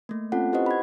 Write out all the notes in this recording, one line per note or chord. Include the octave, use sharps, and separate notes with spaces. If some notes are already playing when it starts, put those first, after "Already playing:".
A3 A#3
C4 C#4 F4 A4 F#5
E4 G4 B4 C5 D#5 F#5
B5 G#6